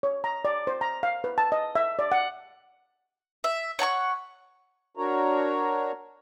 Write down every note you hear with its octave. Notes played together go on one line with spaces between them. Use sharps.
C#5
A#5
D5
C5
A#5
F5
B4
A5
D#5
E5
D5
F#5
E5
C#5 F#5 A5 C#6
D4 F#4 A#4 C#5 A#5